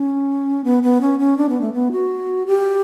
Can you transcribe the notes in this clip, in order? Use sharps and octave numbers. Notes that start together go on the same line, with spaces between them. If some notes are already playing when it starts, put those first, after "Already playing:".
Already playing: C#4
B3
B3
C#4
C#4
D4
B3
A3
B3
F#4
G4